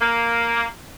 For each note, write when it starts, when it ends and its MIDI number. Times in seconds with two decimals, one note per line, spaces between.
0.01 0.65 58